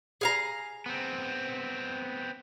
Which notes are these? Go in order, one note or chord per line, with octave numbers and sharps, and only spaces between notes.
G#4 F5 A#5
B3 C4